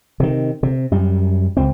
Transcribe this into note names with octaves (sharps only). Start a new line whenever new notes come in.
C3 D#3
C3
F#2 G3
C#2 C4